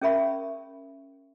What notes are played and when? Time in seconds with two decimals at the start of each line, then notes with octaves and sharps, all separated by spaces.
0.01 C#4 G#4 A#4 E5 B5 C#6